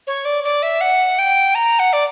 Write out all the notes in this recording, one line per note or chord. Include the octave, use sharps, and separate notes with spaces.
C#5
D5
D5
E5
F#5
G5
A#5
F#5
D5